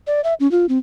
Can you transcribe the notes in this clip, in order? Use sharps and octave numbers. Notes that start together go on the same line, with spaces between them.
D5
E5
C#4
F4
C4